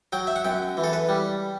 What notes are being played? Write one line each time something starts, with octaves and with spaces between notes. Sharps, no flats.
F#3 G5
E5
F#5
F#2 G5
E3
A4
B4
G3